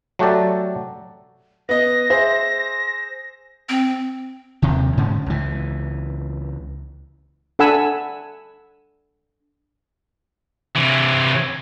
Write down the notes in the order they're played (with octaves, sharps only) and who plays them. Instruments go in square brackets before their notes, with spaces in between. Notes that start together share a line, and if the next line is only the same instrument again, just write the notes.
[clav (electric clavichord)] F#3 A3 F#4 G4 A4 D5
[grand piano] B3 D#5 [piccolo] A#6
[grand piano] G#4 C5 E5
[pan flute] C4
[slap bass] D#2 C3 D#3
G#2 D3 C#4
C#2 E3
[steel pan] D4 A4 F#5 G#5 B5 E6
[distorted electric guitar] C3 E3